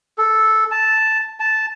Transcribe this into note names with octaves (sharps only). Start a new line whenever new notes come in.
A4
A5
A5